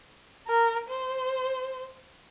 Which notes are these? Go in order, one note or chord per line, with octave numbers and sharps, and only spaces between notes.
A#4
C5